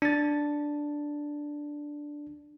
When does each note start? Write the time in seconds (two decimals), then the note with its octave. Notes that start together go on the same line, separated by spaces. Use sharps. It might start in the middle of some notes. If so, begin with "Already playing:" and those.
0.02 D4 A6